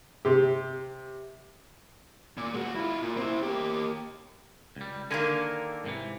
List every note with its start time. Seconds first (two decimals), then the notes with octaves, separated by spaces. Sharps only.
0.25 C3 G4
2.37 A#2
2.54 G#3 F#4
2.75 E4 F4
3.03 A#2
3.17 C4 E4
3.43 A#3 G4
4.76 C#2 G3
5.11 D3 D#3 A#3 A4 A#4 G#5
5.84 G#2 C3 E3